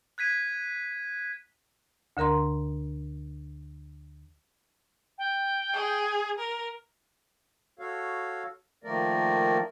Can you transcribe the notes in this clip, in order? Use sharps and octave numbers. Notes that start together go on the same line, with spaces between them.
F#6 G#6 B6 D#7
D2 D3 A#4 A#5 C6
G5
G#4
A#4
F#4 A4 C#5 F5
D#3 F3 A3 A#3 A#4 D5